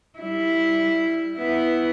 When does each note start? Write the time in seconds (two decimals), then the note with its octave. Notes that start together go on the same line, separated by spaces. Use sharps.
0.19 G3 E4
1.38 B3 E4